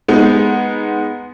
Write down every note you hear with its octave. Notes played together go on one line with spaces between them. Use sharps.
G#3 B3 D#4